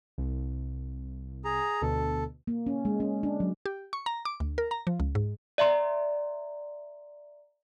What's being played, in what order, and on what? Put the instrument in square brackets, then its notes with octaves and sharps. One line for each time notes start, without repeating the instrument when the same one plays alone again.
[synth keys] C2
[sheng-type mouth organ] G#4 A#5
[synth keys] D2 B2 [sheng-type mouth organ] A4
[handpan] A#3
C#4
G#3
C#4
D4
F#3
[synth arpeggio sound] G4
C#6
A#5
D6
D2
A#4
A#5
F3
C#2
G#2
[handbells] D5 E5 A#5 C6